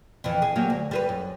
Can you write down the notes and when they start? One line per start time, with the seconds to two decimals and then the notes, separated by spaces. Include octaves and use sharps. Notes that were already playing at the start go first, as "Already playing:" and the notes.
0.24 F2 E3
0.42 G#4
0.56 F#3 G3 A#3
0.70 D2
0.91 G3 G#4 B4
1.09 F#2